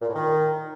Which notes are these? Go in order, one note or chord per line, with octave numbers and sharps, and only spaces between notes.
A#2
A2
D#3